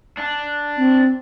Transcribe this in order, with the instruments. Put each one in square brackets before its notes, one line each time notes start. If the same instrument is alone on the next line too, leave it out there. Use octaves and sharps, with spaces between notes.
[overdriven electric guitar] D4
[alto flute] C4